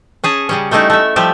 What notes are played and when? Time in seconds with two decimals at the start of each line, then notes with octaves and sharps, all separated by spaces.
0.24 C#4 G#4 A5
0.49 C#3 G3 C#4
0.71 G3 A3 C#4 D#4 E4
0.90 A3 E5
1.16 F3 G3 G4 E5